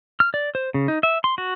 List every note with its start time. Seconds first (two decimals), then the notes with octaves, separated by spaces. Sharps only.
0.20 F6
0.34 D5
0.55 C5
0.74 C#3
0.88 D#4
1.03 E5
1.24 C6
1.38 F#4